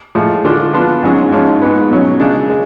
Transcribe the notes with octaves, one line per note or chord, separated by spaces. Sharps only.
A2 F3 G#3
D3 G#3 D4 F4
F3 B3 D4 F4
G#2 F#3 C#4 G#4
G#2 F3 G#3 C#4
G#2 G#3 B3
B2 F#3 C#4
C#3 G#3 D4
G#3